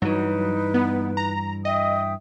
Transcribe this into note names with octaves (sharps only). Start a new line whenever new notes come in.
G2 E3 F#3 D#4 B4
B3
A#5
D#5 E5 G5 D#6